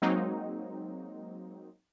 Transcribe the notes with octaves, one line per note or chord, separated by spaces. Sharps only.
F#3 G#3 A#3 C4 D#4